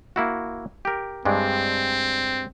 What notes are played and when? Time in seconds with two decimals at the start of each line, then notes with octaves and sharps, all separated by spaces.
0.16 A#3 E4 F#4
0.85 G4 A#4
1.25 G2 G#3 C4 D4